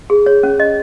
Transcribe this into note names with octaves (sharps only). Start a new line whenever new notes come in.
G#4
C#5
C#4
D#5